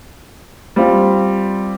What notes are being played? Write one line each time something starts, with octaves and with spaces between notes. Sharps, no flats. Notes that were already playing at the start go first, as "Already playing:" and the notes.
G3 C4 F4